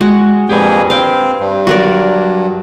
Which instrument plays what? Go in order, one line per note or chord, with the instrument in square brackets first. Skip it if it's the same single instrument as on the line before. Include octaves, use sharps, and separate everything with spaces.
[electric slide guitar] G#3 [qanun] F#4
[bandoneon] F2 A#2 G#4 [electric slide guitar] G4 B4
[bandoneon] C4 [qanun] F5 G5
[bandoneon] G2
[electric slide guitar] F#3 [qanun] F#4 A#4 D5